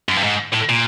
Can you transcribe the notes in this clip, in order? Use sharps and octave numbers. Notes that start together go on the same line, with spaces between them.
F#2
G2
G#2
A2
A#2